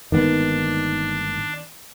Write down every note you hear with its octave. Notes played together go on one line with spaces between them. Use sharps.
G1 G#2 D#3 A#3 B3 D4